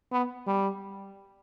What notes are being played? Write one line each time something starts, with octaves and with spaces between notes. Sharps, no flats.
B3
G3